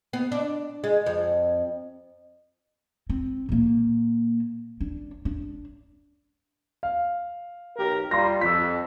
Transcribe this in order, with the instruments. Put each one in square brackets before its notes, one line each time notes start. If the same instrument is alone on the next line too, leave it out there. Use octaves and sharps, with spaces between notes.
[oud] B3
D4
G#3
F2
[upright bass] C4
A#2 A#3
D4
D4
[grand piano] F5
[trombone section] B1 G4 A#4
[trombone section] G3 F4 [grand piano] A#5 C6 A#6
[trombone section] F2 [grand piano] E6 B6